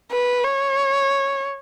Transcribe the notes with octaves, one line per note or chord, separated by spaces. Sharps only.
B4
C#5